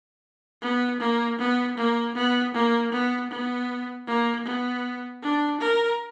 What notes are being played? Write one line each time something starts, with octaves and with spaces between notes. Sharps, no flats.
B3
A#3
B3
A#3
B3
A#3
B3
B3
A#3
B3
D4
A#4